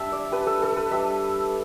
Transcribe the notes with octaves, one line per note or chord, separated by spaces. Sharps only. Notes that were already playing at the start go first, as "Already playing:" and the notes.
Already playing: G3 D4 E5 A5
D5
G3 D4 B4
A4
A4
B4
G3 D4 E5